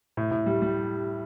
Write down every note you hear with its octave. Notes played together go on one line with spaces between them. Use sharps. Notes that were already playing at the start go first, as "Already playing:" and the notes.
A2
A2
G3
G3